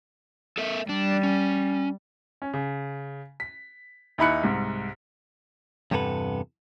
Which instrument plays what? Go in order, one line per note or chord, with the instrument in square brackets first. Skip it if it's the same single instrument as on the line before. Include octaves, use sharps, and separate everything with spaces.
[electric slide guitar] A4 A#4 E5
[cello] G3 [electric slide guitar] D4
[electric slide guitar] C#4
[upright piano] C#4
C#3
B6
D#2 D#4 E4 B5 F#6 C#7
C2 G#2
[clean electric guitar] E2 G2 C3 B3 A4 B4